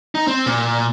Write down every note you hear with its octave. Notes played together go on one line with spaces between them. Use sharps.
D#4
C4
A#2